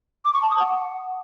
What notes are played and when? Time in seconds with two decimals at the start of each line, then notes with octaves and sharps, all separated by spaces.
0.25 D6
0.33 C#6
0.42 A5
0.51 D#6
0.59 F#5